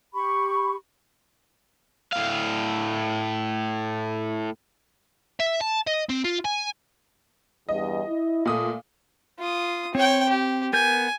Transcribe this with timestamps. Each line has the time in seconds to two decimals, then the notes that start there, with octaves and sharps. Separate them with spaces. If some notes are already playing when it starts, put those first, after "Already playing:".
0.14 G4 B5 C#6
2.12 A2 F5
5.40 E5
5.61 A5
5.87 D#5
6.10 C4
6.25 F4
6.45 G#5
7.69 E2 G2 D#5
8.07 E4
8.45 A#2 A3 D#6
9.39 F4 D#6
9.95 C4 C#5 G5
10.29 G4
10.73 B3 A#4 G#5 G6